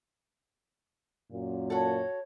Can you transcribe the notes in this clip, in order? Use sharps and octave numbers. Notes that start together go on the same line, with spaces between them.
F#2 A#2
F#4 A4 C#5